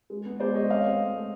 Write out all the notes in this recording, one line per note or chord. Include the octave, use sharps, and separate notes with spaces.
G#3
B3
G#3 C5 D5
G#3 C#5 D#5
C4 D#5 F5
C4
A3
A3